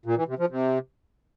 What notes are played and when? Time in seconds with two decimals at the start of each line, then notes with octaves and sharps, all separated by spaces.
0.06 A#2
0.17 E3
0.28 C3
0.39 F3
0.50 C3